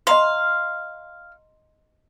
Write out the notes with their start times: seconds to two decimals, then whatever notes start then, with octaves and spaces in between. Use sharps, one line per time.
0.07 D#5 F5 A#5 C6